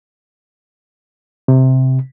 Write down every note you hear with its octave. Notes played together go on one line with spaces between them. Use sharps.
C3